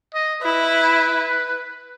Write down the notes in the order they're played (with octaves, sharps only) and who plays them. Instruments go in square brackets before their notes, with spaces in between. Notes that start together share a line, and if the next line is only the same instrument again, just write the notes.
[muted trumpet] D#5
[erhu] E4 [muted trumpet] B4